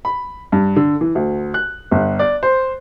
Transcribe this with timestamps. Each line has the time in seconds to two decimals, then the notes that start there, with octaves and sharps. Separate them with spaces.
0.05 B5
0.52 G2
0.76 D3
1.01 E3
1.15 D2
1.54 F#6
1.91 G1
2.19 D5
2.43 C5